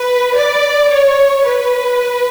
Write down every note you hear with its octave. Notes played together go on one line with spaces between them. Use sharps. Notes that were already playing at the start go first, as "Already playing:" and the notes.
Already playing: B4
D5
C#5
B4